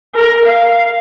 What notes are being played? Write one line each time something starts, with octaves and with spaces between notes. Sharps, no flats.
A#4
F5